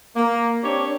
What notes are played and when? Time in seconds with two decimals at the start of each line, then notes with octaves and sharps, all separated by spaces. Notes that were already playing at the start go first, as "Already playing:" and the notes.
0.15 A#3
0.63 C4 D4 G4 C#5